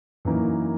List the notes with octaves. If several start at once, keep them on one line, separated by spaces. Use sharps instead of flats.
F#2 E3 A#3 D#4